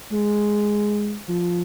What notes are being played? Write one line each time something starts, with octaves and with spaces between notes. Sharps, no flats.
G#3
F3